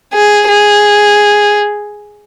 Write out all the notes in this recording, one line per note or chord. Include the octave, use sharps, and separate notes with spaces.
G#4
G#4